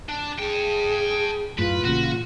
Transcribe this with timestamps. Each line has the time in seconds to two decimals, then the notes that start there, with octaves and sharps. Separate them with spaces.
0.09 D4
0.39 G#4 G5 A5
1.58 F#2 A2 F4 B4
1.84 A1 A#2 C#3 F#4